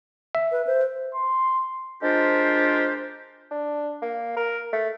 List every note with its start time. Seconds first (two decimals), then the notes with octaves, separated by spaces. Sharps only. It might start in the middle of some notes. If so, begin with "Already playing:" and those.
0.35 E5
0.52 B4
0.67 C5
1.15 C6
2.03 G#3 D4 F4 G4 A#4 C5
3.51 D4
4.02 A#3
4.37 A#4
4.73 A3